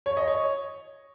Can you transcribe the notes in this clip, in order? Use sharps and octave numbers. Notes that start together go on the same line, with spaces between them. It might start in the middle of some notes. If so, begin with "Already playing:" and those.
C#5
D#5
C#5